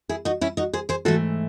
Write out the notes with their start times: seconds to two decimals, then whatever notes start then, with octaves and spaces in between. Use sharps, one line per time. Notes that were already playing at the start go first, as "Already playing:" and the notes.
0.09 E4 G#4
0.25 D#4 F#4
0.41 C#4 E4
0.57 D#4 F#4
0.73 G#4 C5
0.89 G#4 C5
1.05 G#2 E3 A3 F#4 A4